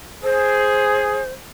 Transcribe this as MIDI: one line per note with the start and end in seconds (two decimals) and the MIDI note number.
0.24 1.20 68
0.24 1.29 72